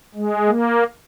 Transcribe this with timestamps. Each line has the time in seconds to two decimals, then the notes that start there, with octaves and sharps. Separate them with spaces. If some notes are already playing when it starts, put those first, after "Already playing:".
0.15 G#3
0.48 A#3